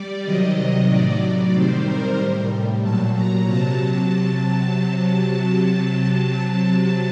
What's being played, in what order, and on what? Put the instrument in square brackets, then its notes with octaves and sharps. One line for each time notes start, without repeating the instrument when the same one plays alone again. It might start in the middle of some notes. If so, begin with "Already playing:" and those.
Already playing: [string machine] G3 D5
C3 D#3 F#3 D#5
A2 F#3 D5
C3 D#3 G3 C5
A#4
A2 G3
A#2 F#3 A5
A#5
C3 F#3 A5